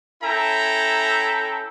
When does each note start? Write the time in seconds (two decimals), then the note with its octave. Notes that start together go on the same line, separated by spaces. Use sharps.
0.22 C#4 E4 A4 E5 G5 A#5